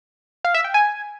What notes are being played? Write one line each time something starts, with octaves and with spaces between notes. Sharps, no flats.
F5
E5
G5
G#5